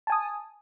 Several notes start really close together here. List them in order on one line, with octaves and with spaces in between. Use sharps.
A5 G#5 D#6